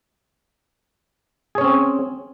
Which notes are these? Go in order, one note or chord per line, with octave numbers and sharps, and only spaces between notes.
C4 C#4 G#4 C#5